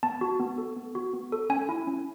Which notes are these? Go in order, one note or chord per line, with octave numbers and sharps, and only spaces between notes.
B3 A5
F#4
B3
A4
B3
F#4
B3
A4
C#4 G#5
E4
C#4